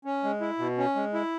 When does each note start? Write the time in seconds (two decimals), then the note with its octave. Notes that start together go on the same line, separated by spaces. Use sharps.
0.05 C#4
0.24 G#3
0.41 E4
0.59 B2
0.78 C#4
0.95 G#3
1.14 E4